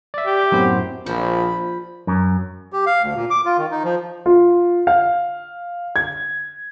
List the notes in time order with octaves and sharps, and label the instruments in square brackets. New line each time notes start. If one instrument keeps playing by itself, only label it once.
[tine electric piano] D5 E5
[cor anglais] G4
[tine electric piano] F#2 A2 C5 [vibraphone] B3 C4 F#5
[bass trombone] A#1 [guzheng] F3 [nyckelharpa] B5
[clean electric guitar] F#2
[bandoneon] G4
F5
D2
A#2
D6
F4
D#3
D#4
F3
[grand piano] F4
F5
G#6